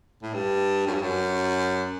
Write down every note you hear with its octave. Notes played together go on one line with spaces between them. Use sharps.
A2
G2
F#2
G2
F#2